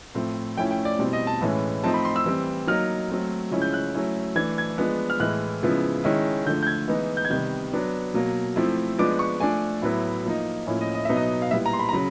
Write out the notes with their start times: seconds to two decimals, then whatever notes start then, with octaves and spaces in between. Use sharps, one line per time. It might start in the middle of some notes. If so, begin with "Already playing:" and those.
0.15 A2 F3 A3 C4
0.57 F3 A3 C#4 E4 G5
0.71 G5
0.85 D5
0.99 B2 G3 C4 E4
1.13 D#5
1.27 A5
1.41 A2 E3 G#3 C#4
1.84 F3 A3 C4 D#4 A5
1.94 B5
2.05 C6
2.16 E6
2.25 E3 G3 C4
2.68 F#3 A#3 D#4 F6
3.10 F#3 A3 C4
3.51 C#3 F3 G#3 C#4 E4
3.62 G6
3.73 F#6
3.95 F#3 A3 C#4 E4
4.36 E3 A3 D4 G#6
4.58 G#6
4.78 F3 G#3 B3 D4
5.10 F6
5.20 A2 E3 G#3 F#6
5.63 C#3 F3 G#3 B3 E4
6.04 D#3 G#3 C#4 E4
6.46 D3 F3 A3 G6
6.63 G6
6.67 G#6
6.88 E3 G#3 B3 D#4
7.17 G6
7.25 G#6
7.30 C3 D#3 G3 B3 G6
7.73 F#3 B3 D4
8.14 B2 F#3 A#3
8.56 F3 A3 C4 E4
8.98 F3 G#3 B3 D4 D6
9.19 C#6
9.40 F3 A3 D4 G#5
9.82 A2 F#3 B3 E4
10.25 F3 A#3 D#4
10.67 A2 F3 A#3 C#4 E4
10.81 D#5
10.94 D#5
11.05 B2 F#3 B3 D#4 E5
11.17 D#5
11.42 F5
11.51 A#2 G3 B3 E4 E5
11.66 A#5
11.73 C6
11.79 B5
11.89 A#5
11.93 C#3 F#3 B5